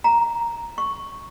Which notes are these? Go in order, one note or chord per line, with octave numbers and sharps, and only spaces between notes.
A#5
C#6